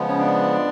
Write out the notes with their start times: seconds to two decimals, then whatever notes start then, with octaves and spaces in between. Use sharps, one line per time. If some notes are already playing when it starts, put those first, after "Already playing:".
Already playing: C#3 F3 G#3 B3
0.09 C#4
0.20 D4